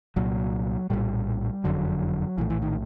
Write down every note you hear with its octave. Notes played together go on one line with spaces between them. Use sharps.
C2 A#2 F#3
A#1 A2 G3
F#1 F2 D3 F#3
A#1 A2 E3
E3
D#3